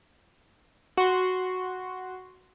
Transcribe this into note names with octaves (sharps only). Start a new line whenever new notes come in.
F#4 C6